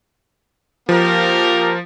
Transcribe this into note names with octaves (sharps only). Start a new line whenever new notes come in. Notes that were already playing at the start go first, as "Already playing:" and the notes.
F3 A#3 G4 A#4